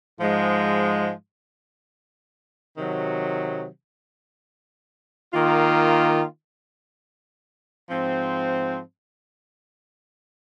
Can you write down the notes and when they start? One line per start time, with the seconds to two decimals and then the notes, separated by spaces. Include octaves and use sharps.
0.20 G#2 F3 G#3
2.77 C3 D#3 F#3
5.33 D#3 A#3 F4
7.90 G#2 F3 C4